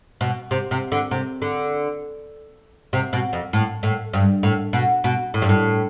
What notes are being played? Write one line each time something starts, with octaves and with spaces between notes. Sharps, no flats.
B2
C3
C3
D3
C3
D3
C3
B2
F2
A2
A2
G2
A2
B2
B2
A2
G2
A2